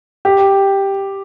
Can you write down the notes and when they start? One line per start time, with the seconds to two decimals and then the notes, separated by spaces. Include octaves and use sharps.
0.25 G4